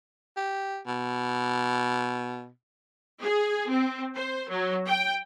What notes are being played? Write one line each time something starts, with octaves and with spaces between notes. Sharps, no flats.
G4
B2
G#4
C4
C5
F#3
G5